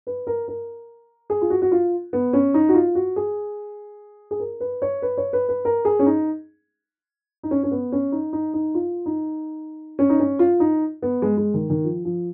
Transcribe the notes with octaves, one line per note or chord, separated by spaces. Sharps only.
B4
A#4
A#4
G#4
F4
F#4
F#4
F4
B3
C#4
D#4
F#4
F4
F#4
G#4
G#4
A#4
B4
C#5
B4
C#5
B4
B4
A#4
G#4
C#4
D#4
D#4
C#4
C#4
B3
C#4
D#4
D#4
D#4
F4
D#4
C#4
D#4
C#4
F4
D#4
B3
G#3
G#3
D#3
D#3
F3
F3